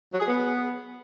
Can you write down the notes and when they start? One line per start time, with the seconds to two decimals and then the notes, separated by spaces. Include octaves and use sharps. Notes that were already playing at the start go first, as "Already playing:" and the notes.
0.13 F#3
0.20 G#4
0.27 B3